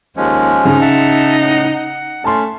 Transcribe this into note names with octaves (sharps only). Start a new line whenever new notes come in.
D#2 F3 G#3 C#4
C#3 D#4
E5 F#5 A5
A2 F#5
F#5
A3 C#4 A5 C6